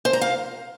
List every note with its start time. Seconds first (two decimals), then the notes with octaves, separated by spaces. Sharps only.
0.05 C5
0.13 A#5
0.21 F5